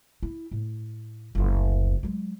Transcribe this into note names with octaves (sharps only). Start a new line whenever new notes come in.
E4
A2
F#1 D2
F#3 G#3